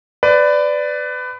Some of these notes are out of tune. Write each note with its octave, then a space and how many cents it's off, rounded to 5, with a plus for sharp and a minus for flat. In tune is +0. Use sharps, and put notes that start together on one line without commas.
B4 +25 D5 +0